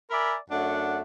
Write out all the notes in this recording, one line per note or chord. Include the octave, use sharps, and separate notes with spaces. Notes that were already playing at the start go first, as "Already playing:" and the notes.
A#4 D5 E5 G#5 B5
F#2 A3 D4 F#5